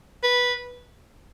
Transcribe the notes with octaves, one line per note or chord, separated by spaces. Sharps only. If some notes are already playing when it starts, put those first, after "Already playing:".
B4